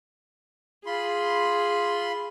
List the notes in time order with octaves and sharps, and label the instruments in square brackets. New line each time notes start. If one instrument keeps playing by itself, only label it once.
[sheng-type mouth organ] F4 B5 C6 [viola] G#4